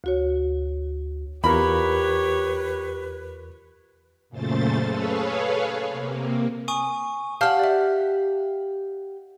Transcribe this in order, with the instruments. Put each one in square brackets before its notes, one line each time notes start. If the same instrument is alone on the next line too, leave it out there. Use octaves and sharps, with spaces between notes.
[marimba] D2 F#4 C#5
[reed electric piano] E2 F4 A#4 [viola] G4 C#5 [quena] B4 [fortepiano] B5
[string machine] F#2 A#2 C#3 A3 C5 A6
G#4 A4 B4 C#5 F5
C3 A#3
[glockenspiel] G#5 C#6 D#6 D#7
[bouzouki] G4 F#5 [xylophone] F5 A5 F6
[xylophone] D5 E5